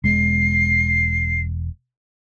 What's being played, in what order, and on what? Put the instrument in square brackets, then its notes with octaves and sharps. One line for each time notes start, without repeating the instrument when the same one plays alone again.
[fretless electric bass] E1 G#3 [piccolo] C7